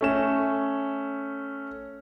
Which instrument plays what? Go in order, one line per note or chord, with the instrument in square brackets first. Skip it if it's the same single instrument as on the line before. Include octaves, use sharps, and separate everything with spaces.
[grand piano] A3 C#4 E7